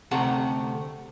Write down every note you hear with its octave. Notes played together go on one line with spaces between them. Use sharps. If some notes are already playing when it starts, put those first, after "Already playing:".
D2 C3 A3 F#5 A#5